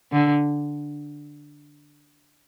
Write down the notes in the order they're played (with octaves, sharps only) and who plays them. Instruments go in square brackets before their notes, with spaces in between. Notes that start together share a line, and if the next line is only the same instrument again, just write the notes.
[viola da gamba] D3